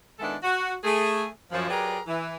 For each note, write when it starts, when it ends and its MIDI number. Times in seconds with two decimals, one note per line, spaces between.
0.20 0.35 51
0.20 0.35 56
0.20 0.35 59
0.20 0.35 62
0.20 0.35 64
0.20 0.35 69
0.43 0.73 66
0.84 1.26 57
0.84 1.26 68
1.52 1.66 42
1.52 1.66 53
1.69 1.99 54
1.69 1.99 67
1.69 1.99 68
1.69 1.99 70
1.69 1.99 71
1.69 1.99 74
2.07 2.37 52